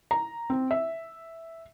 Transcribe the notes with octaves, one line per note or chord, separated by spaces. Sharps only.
A#5
C4
E5